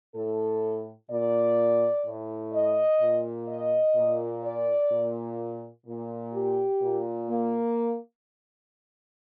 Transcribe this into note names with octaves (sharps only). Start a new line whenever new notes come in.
A2 A4
A#2 D5
A2
D#5
A#2
D#5
A#2
D5
A#2
A#2
G4
A#2
A#3